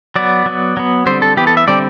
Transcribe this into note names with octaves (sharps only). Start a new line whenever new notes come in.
F#3 B3 D5
F#3 B3
F#3 B3
D3 G3 C4 C5
A4
E3 B3 G4
A4
E5
D3 G3 C4 D5